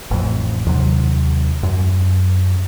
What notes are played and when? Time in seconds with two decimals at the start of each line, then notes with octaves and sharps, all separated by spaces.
0.11 A1 F2
0.66 D#2 C3 F#3
1.63 F#2